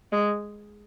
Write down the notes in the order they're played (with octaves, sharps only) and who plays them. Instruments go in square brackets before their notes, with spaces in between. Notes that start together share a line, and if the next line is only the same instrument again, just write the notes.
[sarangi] G#3